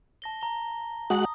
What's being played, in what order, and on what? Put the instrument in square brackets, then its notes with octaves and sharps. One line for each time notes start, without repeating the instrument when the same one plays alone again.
[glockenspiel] A5 A#6 G7
A#5 G7
[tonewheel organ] G#3 F#4 F#5 [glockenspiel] D#6